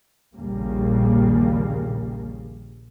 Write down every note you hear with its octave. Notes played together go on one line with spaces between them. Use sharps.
A#1 D#2 C#3 G3 A#3